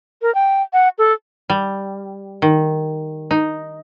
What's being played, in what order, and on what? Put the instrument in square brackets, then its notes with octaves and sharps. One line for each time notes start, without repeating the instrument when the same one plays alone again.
[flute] A#4
G5
F#5
A4
[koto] G3
D#3
D#4